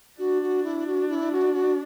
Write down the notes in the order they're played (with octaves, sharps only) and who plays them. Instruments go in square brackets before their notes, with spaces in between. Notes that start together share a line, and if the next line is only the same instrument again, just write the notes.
[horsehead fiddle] D4 [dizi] F#4
[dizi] F#4
E4
F#4
E4
F#4
F#4